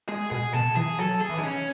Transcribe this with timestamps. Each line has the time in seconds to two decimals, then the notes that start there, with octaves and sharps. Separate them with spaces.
0.08 G#3 G#4
0.30 B2 G#4
0.53 B2 A4
0.76 E3 G#4
0.98 F#3 A4
1.21 G#4
1.29 E3
1.38 D#4
1.43 C#4